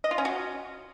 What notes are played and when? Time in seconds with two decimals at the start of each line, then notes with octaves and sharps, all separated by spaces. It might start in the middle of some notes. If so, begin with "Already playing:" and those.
0.04 D#5
0.11 F4
0.18 C#4
0.25 F#4